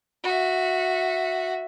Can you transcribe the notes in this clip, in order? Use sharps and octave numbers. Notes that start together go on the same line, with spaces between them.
F#4 E5